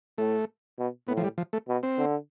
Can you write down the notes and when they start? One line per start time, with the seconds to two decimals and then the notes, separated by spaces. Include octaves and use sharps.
0.18 A2 A3
0.78 B2
1.08 A2 B3
1.17 F3
1.24 G3
1.38 F3
1.53 A3
1.68 B2
1.83 C4
1.98 D3